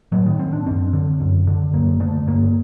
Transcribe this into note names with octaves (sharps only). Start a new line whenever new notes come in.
A2 F#3
D#3
C4
D4
F#2 C4
D3
F#2
D3
F#2 A#3
D3 A3
G2 A#3